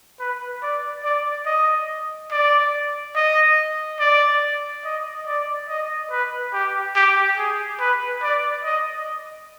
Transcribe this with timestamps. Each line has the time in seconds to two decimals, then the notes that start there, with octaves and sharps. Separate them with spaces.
0.20 B4
0.63 D5
1.04 D5
1.46 D#5
2.32 D5
3.15 D#5
4.00 D5
4.85 D#5
5.27 D5
5.69 D#5
6.11 B4
6.54 G4
6.96 G4
7.38 G#4
7.80 B4
8.23 D5
8.64 D#5